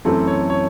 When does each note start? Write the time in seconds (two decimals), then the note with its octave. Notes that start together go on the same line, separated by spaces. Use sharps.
0.05 F#2 E3 A3 C4 A4
0.27 C#5
0.50 C#5